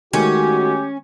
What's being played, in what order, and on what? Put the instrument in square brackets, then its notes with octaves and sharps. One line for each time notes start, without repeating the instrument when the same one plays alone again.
[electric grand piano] D#3 G#3 A3 [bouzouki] C#4 [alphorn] F#4 [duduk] G4